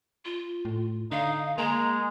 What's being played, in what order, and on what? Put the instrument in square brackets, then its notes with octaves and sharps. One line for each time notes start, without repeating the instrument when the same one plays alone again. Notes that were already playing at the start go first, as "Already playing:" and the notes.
[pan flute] F4
[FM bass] A2
[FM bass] D3 [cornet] D#4 [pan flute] F5
[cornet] G#3 [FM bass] A#3 [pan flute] A#5